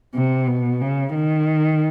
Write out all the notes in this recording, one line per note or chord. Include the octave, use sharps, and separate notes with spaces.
C3
B2
C#3
D#3